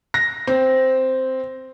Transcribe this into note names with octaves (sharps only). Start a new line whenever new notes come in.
A#6
C4